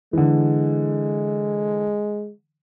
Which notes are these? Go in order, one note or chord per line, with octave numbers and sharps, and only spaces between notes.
D3 E3 G#3